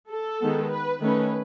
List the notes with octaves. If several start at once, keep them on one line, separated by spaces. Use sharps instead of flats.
A4
D#3 G#3 B3
B4
D#3 A3 C#4 B4